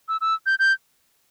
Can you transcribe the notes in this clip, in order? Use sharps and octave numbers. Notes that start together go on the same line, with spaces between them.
E6
E6
G6
G6